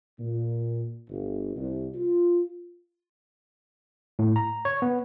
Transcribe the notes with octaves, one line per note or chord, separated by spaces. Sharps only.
A#2
G1
C2
F4
A2
A#5
C#5
B3